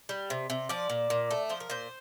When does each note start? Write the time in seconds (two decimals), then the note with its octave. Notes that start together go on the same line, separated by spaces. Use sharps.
0.09 G3
0.30 C3
0.50 C3
0.69 F3 D5
0.90 A#2
1.10 A#2
1.31 A3
1.49 F3 C5
1.60 A#4
1.70 A#2 C5